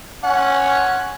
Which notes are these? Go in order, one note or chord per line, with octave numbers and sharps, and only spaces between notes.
C#4 F#5